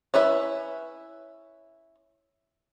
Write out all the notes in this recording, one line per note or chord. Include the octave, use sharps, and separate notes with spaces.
C#4 E4 B4 E5